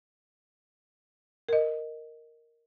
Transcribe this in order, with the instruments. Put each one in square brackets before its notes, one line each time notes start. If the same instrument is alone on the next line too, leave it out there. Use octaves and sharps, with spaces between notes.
[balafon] A#4 D#5